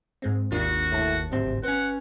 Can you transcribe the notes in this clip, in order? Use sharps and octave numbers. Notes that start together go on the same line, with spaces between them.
G#2 G#3 C4
G#1 D#2 D4 F4 F#4
G1 A2 A5
D1 G#1 C3 C4
C4 C#4 B4 F#5